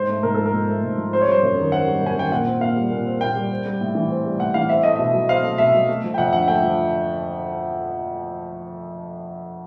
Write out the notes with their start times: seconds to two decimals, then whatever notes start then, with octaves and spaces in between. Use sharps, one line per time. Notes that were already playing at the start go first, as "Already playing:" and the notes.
Already playing: G#2 C5
0.09 A3
0.23 G#2 A#4
0.34 F3 A4
0.46 A#4
0.53 G#2
0.68 A3
0.83 G#2
0.97 F3
1.13 C4 C5
1.22 C#5
1.28 G3 C5
1.42 F#2
1.58 D#3
1.72 C4 F#5
1.87 G3
2.01 F#2
2.06 G#5
2.16 D#3 G5
2.32 A#2 F#5
2.46 C4
2.61 A#2 F5
2.76 G3
2.90 A#2
3.05 C4
3.21 A#2 G5
3.36 G3
3.51 C4
3.65 G3
3.81 A2
3.95 E3
4.10 C4
4.25 G3
4.39 A2 F#5
4.54 E3 F5
4.69 C4 E5
4.83 A3 D#5
4.96 B2 E5
5.14 F#3
5.28 C4 F5
5.44 A3
5.58 B2 E5
5.74 F#3
5.88 A3
6.04 F3
6.14 G5
6.18 F2 F#5
6.33 D3 F#5
6.48 A3 G5
6.62 F3